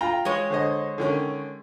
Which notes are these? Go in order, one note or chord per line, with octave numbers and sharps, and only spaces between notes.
F4 G5 A#5
G#3 C#5
D3 C5 D#5
D3 D#3 C#4